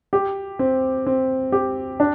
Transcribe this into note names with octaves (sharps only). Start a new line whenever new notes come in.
G4
C4
C4
G4
D4